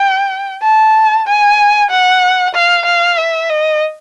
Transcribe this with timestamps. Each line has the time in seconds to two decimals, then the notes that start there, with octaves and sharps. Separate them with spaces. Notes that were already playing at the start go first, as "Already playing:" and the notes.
Already playing: G5
0.63 A5
1.27 G#5
1.91 F#5
2.54 F5
2.86 F5
3.18 E5
3.49 D#5